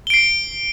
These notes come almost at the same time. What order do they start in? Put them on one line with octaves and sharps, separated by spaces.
G7 D7 C7